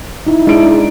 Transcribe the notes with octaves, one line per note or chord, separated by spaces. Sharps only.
D#4 E4
G#3 D4 E4 G#4 D5 D7